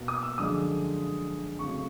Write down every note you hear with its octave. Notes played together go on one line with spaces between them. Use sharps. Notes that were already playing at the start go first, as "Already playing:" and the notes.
Already playing: B2 A#3
D#6
E6
F#2 D3 F3 G#3 D#6
C#3 F#3 A3 C4 C#6